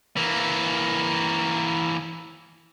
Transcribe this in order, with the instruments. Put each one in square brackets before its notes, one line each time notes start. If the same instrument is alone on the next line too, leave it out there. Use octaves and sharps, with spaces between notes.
[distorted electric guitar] E3 A#3